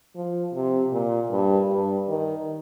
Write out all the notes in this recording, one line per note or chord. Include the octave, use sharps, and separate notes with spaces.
F3
C3
A#2
G2
G2
D#3